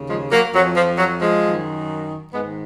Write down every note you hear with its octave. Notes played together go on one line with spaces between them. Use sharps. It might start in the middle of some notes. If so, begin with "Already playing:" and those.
Already playing: D#2 C#3
F3 G#3
F#3 A#3
F2 F3 F#3
F3
F#3
F3 G#3
F#2 D#3
G#2 D#3 G#3 B3